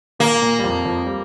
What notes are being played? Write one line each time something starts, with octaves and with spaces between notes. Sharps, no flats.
A#2 A#3
A#2
G3
F2 F3
F2 F3
G3